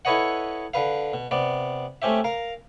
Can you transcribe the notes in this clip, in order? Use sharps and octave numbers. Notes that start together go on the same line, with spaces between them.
E4 A4 B4 C#5 D#5 F#5
D3 B4 F5
B2
C3 B3 D5
A3 C4 C#4 G4 E5
A#4 F5 A#5